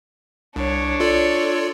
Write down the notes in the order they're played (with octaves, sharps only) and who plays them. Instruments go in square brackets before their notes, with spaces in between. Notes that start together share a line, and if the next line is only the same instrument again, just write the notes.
[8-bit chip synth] C2 [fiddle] D4 C#5
[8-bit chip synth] F4 A4 D5